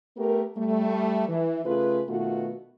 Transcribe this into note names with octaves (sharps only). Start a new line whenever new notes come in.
A3 B3 G4 A#4
G3 A3
E3
C#3 A3 F4 G#4 B4
B2 D#3 A3 B3 F4 F#4